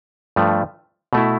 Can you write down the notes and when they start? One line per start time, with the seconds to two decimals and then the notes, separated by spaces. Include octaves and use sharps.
0.36 G2 F3 A3
1.13 B2 A3 E4